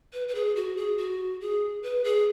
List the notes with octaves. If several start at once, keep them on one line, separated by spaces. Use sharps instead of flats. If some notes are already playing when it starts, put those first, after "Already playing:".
B4
B4
G#4
F#4
G#4
F#4
G#4
B4
G#4